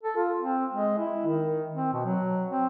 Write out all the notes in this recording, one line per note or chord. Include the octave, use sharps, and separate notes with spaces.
A4
F4
C4
G#3
E4
D#3
C4
B2
F#3
C4